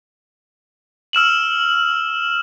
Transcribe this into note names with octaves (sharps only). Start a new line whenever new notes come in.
E6 F6 E7 F#7